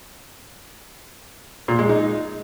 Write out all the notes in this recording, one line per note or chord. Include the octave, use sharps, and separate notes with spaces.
A#2
G#3
D#4